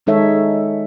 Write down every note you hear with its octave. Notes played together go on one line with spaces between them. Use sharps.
D#3 G#3 D#4 A4 C#5 E5